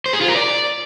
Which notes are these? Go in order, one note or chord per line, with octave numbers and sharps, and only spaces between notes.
C5
G#4
F4
A#4
D5